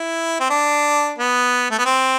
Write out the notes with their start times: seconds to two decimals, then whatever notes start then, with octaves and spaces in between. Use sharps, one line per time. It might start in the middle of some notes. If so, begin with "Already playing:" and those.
Already playing: E4
0.40 C4
0.50 D4
1.18 B3
1.71 A3
1.78 B3
1.85 C4